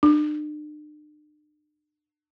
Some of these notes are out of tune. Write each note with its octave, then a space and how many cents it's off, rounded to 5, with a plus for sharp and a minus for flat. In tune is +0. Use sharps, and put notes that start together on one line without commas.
D4 +45